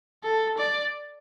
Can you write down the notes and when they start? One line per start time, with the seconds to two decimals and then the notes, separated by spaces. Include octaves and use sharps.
0.24 A4
0.58 D5